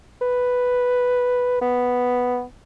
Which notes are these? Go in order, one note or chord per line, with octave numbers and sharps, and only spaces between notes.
B4
B3